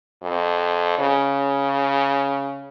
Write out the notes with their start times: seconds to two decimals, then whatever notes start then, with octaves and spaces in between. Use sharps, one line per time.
0.23 F2
0.99 C#3